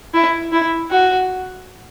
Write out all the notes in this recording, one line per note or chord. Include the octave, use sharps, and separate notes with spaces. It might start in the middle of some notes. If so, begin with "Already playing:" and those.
E4
E4
F#4